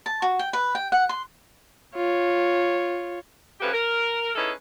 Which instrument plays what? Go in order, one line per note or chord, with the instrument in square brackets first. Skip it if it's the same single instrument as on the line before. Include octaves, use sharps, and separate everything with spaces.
[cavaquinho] A5
F#4
G5
B4
G5
F#5
C6
[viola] F4 C#5
[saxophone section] F3 A3 C#4 F#4 G4 B4
A#4
C#4 D#4 E4 G#4 A4 B4